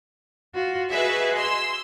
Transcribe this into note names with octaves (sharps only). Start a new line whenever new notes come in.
F4 F#4
F#4 G#4 B4 D#5 E5
C6 E6